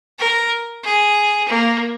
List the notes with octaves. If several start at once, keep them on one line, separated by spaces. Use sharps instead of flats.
A#4
G#4
A#3